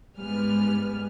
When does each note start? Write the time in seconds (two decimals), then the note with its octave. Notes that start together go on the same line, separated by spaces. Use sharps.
0.19 G#2 G3 B3 B4 G#5 F6